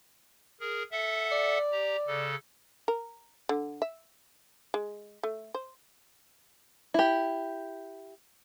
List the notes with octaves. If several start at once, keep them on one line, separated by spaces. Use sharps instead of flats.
G#4 A#4
A4 E5 F#5
D5
G4 A#5
C#3 A4
A#4
D3
E5
G#3
A3
C5
E4 G4